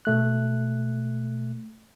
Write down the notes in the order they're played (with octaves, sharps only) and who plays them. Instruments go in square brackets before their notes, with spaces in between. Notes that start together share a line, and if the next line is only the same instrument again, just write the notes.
[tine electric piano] B2 A3 F#6